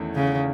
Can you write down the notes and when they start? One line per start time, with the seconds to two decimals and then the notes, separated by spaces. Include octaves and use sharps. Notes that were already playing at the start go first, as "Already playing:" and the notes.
Already playing: E2 D#3 A3 C#4 E4
0.15 C#3